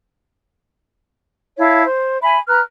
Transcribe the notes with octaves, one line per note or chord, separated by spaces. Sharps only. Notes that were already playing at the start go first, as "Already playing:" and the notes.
E4 C#5 F5 A5
C5
E5 G#5 B5
B4 A#5 F6 F#6